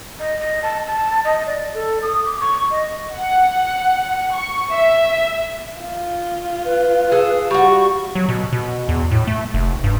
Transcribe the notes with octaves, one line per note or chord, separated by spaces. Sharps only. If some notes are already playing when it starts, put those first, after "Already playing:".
D#5
D#5
A5
A5
D#5
D5
A4
D#6
D6
C#6
D#5
F#5
C#6
E5
F4
B4
G#4 A4
G3 F#4 C#6
F#3
B2
B2
E2
A2
A3
F1
G2